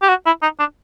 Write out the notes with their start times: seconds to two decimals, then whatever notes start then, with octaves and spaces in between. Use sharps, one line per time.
0.03 G4
0.09 F#4
0.26 E4
0.42 D#4
0.59 D4